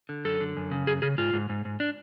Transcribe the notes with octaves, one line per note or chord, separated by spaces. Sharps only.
D3
F#2 A4
D3
F#2
C#3
F#2 G#4
C#3 G#4
G#2 F4
G#2
G#2
G#2
D4